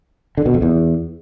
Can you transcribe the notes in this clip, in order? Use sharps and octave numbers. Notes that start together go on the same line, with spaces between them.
D3
B2
F2
E2